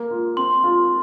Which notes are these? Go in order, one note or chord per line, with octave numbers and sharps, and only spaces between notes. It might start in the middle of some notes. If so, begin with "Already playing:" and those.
Already playing: A#3
F4
C4 C6
F4